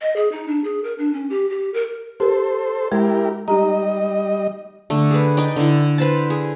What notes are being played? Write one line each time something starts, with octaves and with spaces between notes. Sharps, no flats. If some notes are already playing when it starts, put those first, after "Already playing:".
D#5
G#4
D#4
D4
G#4
A#4
D4
C#4
G4
G4
A#4
G4 A4 A#4 C5
G#3 E4 G4 A#4
G3 D#4 G4 D#5 A#5
D3 A3
G#4 B4
D#4 D5 G5
D3 E4
B4 C5 A5
G#4